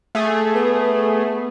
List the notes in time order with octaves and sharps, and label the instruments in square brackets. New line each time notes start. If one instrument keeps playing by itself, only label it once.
[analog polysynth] A3 G#4
[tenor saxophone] B3